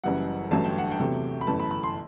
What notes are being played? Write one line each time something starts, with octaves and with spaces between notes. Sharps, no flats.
F#1 F#2 E3 G3 F#5
A1 G2 D3 F#3 A3 A5
G5
F#5
G5
E2 C3 F#3 A3
B5
G1 F#2 E3 A3 A5
B5
B5
C6